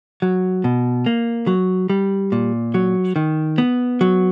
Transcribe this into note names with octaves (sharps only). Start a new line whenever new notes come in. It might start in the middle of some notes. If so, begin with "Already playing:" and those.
F#3
B2
A#3
F#3
G3
A#2
F#3
D#3
B3
F#3